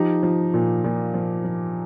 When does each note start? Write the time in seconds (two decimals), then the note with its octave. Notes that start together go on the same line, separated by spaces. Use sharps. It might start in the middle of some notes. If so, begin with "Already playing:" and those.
Already playing: F3 D#4 G4
0.23 F3
0.54 A#2
0.84 A#2
1.14 F3
1.44 F3